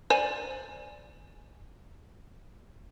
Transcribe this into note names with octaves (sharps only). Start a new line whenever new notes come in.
C5 D5 G#5